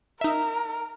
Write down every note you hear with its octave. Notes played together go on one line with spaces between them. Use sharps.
D#4 A#4 E5